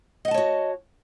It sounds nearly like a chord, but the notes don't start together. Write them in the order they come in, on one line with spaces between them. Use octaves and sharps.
D#5 F#5 A5 C#5 F#4